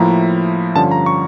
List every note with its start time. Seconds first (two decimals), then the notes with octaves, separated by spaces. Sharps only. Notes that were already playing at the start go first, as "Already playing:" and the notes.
Already playing: A2 F3 A#3 E4 A#5
0.76 G2 D3 F3 C#4 A5
0.91 A#5
1.06 C#6